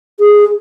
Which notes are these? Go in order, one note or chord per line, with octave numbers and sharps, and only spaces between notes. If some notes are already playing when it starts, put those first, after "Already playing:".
G#4